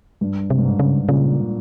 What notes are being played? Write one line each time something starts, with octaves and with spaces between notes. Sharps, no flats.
G2
C3
G2
G#2
C#3
A#2 C#3